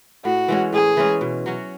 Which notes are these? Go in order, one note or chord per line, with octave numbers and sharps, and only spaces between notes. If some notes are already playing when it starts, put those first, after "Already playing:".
A2 F#4
E3 G#3 C#4
A2 G#4
E3 G#3 C#4
B2
F#3 C#4 F#4